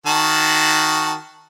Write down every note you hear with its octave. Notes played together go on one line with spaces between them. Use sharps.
D#3 F#4 A5